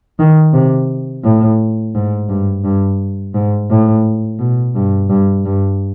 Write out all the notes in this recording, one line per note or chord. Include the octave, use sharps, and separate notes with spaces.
D#3
C3
A2
G#2
G2
G2
G#2
A2
B2
G2
G2
G2